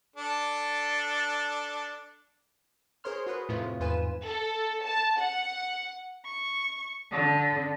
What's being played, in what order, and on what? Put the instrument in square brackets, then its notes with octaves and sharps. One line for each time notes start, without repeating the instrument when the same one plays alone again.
[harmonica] D4 A4
[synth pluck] G#4 A#4 C5 C#5 C6 F6
F#4 G#4 B4
F2 A2 C3 F3 A3 F4
E2 G#2 F4 B4 G#5 E7
[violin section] A4
A5
F#5
[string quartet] C#6
D3